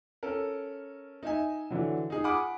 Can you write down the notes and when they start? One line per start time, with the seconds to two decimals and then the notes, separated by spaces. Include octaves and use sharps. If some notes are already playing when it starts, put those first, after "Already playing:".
0.23 C#4 A4 A#4
1.23 D#4 D#5 E5 G#5
1.71 D3 E3 F#3
2.10 D#4 G#4
2.24 F#5 G#5 B5 D6 D#6